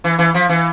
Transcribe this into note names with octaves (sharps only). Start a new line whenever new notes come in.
E3
E3
F3
E3